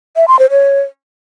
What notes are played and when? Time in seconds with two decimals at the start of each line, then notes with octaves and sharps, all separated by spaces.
0.16 E5
0.28 C6
0.39 C5
0.51 C#5